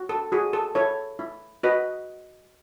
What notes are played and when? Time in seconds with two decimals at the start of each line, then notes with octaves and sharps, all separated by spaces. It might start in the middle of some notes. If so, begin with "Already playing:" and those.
Already playing: F#4
0.09 A4
0.32 F#4 G#4
0.53 A4
0.75 E4 A4 C#5
1.19 E4
1.63 F#4 B4 D#5